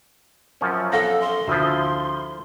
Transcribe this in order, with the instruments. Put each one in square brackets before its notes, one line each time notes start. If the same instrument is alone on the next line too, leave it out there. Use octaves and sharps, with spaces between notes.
[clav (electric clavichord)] F#2 F3 C#4
[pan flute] A4 [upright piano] F5 F#5 A#6
[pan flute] C6
[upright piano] D2 D#6 [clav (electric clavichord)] F3 E4 C5